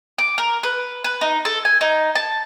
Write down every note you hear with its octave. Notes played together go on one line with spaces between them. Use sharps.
D6
A#4
B4
B4
D#4
A4
G#5
D#4
A5